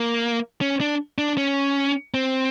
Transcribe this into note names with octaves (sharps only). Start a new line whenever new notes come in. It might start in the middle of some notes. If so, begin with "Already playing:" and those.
Already playing: A#3
C#4
D4
D4
C#4
C4